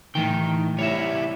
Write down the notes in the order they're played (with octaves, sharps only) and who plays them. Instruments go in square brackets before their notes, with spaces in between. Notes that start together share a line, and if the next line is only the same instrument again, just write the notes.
[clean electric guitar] A2 E3 G5 [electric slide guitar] D#3
[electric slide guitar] G3 E4 [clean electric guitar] C#5 E5